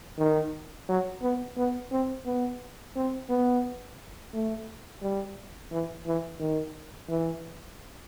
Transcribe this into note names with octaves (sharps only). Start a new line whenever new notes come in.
D#3
F#3
B3
B3
C4
B3
C4
B3
A3
G3
E3
E3
D#3
E3